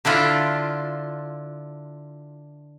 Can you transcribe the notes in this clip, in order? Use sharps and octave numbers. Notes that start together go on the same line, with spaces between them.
D3 D4 E4 F4